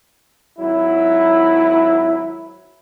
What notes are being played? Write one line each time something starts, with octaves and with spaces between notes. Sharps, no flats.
G#1 F#3 E4